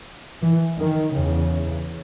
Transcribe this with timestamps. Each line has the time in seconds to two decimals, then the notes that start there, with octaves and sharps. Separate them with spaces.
0.42 E3
0.79 D#3
1.15 E2 C#3